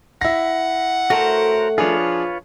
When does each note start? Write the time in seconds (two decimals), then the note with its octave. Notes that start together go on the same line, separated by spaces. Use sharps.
0.21 E4 F#5 A#6
1.10 A3 C#4 F#4 A#4 C5
1.78 F3 D4 F4 G#4 B4 C#5